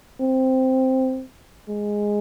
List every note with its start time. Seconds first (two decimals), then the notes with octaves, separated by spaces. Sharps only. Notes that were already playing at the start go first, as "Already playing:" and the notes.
0.21 C4
1.69 G#3